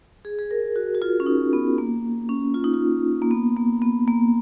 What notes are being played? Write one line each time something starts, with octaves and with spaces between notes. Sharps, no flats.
G#4
G#4
A#4
F#4
F#4
F4
C#4
D#4
B3
A#3
C#4
F4
D#4
F4
A#3
B3
A#3
B3
A#3